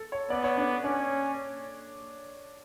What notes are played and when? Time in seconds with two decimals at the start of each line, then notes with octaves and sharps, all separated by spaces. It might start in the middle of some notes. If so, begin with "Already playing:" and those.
Already playing: A4
0.12 C#5
0.30 B3 D5
0.44 C#5
0.57 D4
0.84 C#4 D4